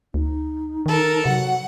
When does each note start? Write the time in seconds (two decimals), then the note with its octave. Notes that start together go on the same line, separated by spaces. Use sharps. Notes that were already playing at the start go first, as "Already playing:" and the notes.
0.14 D2 D#4
0.86 D#3 A4 A#4
1.26 C3 F#3 F#5